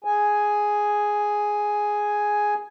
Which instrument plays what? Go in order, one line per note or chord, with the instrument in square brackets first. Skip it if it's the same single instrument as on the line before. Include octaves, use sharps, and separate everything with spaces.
[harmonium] G#4 G#5